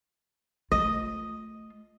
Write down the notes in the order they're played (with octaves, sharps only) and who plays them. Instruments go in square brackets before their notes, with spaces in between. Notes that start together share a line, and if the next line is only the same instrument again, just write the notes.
[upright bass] A3 F4 [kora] D#5